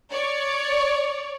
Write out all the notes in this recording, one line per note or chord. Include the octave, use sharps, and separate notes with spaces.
C#5 D5